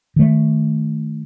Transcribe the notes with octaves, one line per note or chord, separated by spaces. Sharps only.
D#3 A3